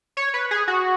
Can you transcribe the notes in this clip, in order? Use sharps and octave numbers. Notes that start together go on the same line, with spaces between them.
C#5
B4
G#4
F#4